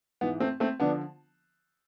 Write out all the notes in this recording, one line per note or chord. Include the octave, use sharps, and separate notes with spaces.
G#2 E3 B3
A3 C4
A3 C4
D3 F3 B3 D4